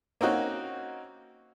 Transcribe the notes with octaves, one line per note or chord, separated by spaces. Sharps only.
A#3 C4 C#4 D#4 F#4